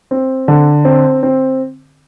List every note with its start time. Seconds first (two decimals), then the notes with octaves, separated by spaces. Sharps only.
0.11 C4
0.48 D3
0.85 C4
1.23 C4